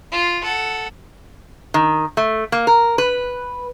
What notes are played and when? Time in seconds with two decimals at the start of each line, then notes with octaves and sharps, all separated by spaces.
0.12 F4
0.43 A4 F#5
1.74 D#3
2.17 A3
2.52 A#3
2.67 A#4
2.98 B4